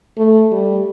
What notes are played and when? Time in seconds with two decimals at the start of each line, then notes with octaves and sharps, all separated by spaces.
0.17 A3
0.52 G3